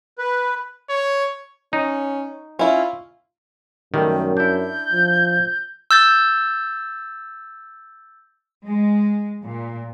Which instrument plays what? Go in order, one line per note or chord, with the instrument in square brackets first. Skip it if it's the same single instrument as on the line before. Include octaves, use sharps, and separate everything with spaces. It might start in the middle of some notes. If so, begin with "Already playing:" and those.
[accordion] B4
[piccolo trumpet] C#5
[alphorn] C#4 [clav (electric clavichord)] D#4
[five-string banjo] C#4 E4 [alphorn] F4
[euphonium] F#2 [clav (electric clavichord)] D#3 G3 A3
[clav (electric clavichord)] D4 E4 [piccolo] G6
[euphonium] F3
[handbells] E6 G6 A6
[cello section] G#3
A#2